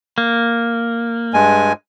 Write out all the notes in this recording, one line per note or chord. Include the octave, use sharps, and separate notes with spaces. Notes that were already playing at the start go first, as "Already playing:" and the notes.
A#3
G2 G#3 G#5